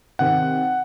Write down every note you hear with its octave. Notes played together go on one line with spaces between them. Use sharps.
C3 D#3 C4 F#5